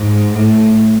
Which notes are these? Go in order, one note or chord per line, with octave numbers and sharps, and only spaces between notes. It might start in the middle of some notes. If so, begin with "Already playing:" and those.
Already playing: G#2
A2